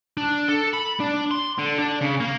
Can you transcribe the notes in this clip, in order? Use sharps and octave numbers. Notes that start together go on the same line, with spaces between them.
D4
A4
B5
D4
C6
D3
D4
C#3
A#3